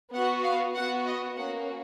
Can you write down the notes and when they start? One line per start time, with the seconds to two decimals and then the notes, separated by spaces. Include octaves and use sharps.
0.14 B3 F#4 F#5
0.44 F5
0.75 B3 F#4 F#5
1.06 D#5
1.37 A#3 C#4 F#4 F#5